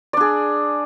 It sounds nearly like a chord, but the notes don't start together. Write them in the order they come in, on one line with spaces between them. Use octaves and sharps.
D5 D4 G#4